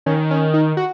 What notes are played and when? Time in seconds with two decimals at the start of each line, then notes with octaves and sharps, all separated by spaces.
0.06 D#3 C#4
0.31 C#4
0.54 D#4
0.77 F#4